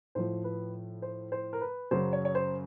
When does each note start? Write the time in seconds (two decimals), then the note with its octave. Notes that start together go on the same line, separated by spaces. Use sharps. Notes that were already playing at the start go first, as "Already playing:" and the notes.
0.15 A2 F3 C5
0.44 B4
1.02 C5
1.32 C5
1.53 A#4
1.61 B4
1.91 F#2 C#3 F#3 C5
2.13 C#5
2.25 C#5
2.35 C5